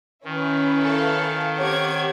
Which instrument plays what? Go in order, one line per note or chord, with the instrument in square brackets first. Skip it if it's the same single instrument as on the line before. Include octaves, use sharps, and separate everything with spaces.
[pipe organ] D#3 [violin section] C#4 E4 B4
[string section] A4 F5
[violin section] C4 D6 G#6 [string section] G4 C#5 F#5